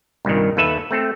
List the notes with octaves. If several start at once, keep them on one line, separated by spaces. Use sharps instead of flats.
C2 G2 A#2 D#3
D#2 A4 B4 E5 A5
A3 C4 A4